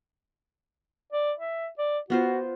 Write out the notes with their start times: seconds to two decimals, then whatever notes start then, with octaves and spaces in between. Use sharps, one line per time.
1.12 D5
1.38 E5
1.78 D5
2.10 B3 F4 F#4 C5